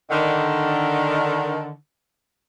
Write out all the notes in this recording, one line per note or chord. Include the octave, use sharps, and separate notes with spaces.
D3 D#3